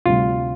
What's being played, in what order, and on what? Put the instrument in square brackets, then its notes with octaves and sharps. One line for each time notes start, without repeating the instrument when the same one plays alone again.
[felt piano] D2 C3 G3 [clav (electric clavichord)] F4